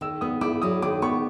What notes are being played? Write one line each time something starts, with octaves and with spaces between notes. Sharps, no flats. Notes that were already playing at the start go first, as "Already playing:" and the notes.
D#3 E6
B3 D#6
E4 D6
F#3 D#6
D#3 D6
B3 C#6